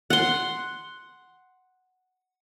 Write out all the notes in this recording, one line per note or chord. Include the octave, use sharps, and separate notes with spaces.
F#5 C6